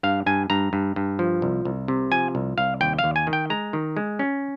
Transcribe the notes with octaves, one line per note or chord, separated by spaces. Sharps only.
G2 F5
G2 G#5
G2 A#5
G2
G2
F3
C2
C2
C3
F3 G#5
C2
C2 F5
D#2 G5
F5
D#2
G#5
D#3
G5
G#3 A#5
D#3
G#3
C#4